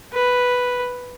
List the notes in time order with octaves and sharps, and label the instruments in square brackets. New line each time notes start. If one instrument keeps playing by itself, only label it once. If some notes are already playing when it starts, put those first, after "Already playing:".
[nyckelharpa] B4